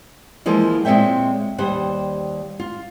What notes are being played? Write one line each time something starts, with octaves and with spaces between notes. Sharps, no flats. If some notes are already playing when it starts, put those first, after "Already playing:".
E3 F3 G#3 A#3
A#2 G#3 C4 C#5 E5 G5
D#2 G3 C5 F#5
F4